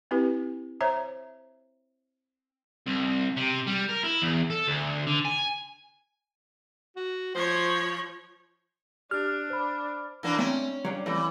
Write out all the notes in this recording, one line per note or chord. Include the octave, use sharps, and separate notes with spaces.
C4 E4 G4 B4
C5 C#5 E5 A#5
C2
C3
G3
A#4
E4
E2
A4
D2
D3
G#5
F#4
F3 C5 C#5
D4 G4 F6
C5 B5
E3 A#3 D4
A3 C4 C#4 A#5
F#3 G3 D4
F2 E3 G3 A3